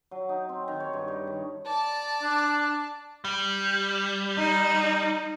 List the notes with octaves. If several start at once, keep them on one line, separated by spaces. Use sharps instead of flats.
F#3
D#4
C4
D#3
C#5
G2
G3
D#3
D5 A5
D4
G3
D#4